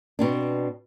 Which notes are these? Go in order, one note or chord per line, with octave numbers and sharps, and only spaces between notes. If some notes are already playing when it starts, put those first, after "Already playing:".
B2 C4 D4